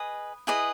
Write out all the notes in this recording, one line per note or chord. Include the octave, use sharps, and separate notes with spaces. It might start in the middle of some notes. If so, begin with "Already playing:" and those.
Already playing: G#4 B4 D#5 D#6
E4 G#4 B4 D#5